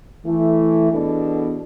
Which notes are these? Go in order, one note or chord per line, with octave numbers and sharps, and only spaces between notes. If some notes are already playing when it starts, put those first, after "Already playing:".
E3 A3 E4
E2 B2 B3 D4 A4